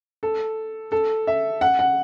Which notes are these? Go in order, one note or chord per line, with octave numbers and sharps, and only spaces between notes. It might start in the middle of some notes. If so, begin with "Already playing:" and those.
A4
A4
E5
F#5
F#5